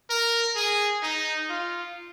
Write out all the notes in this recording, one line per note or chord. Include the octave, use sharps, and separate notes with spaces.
A#4
G#4
D#4
F4